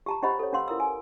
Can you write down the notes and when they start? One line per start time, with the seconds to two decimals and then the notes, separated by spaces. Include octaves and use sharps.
0.06 G4 A5 A#5
0.22 C#4 G4 C5 D#5 F#5 B5
0.39 A4 C#5
0.53 C#4 B4 F5 F#5 C6 E6
0.68 E4 A#4 A#5 D#6 E6
0.80 G#5